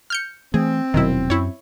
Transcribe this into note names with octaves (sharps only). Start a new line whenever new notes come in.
F6 G6 C#7
E3 A3 C4 G#4
D#1 B2 D#3 F#3 E4
F#2 E4 C#5